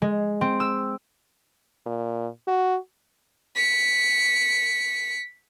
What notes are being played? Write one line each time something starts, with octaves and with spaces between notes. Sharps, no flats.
G#3
C4
E6
A#2
F#4
B6 C#7